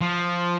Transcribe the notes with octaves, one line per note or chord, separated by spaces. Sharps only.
F3